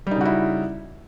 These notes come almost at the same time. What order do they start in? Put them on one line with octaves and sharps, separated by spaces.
G3 D#4 C#3 F#4 E4